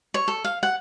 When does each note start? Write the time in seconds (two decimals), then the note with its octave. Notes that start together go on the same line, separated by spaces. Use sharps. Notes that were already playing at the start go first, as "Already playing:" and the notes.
0.14 C#5
0.28 A4
0.44 F5
0.63 F#5